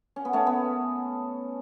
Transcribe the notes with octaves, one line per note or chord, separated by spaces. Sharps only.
C#4
B3
A3 C#4
B3